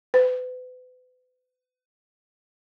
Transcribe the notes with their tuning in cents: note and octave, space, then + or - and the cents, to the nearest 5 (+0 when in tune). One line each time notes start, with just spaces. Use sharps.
B4 +35